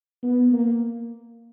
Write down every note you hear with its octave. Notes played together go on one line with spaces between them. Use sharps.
B3
A#3